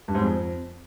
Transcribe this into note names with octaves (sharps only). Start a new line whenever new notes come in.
G2
G#2
F2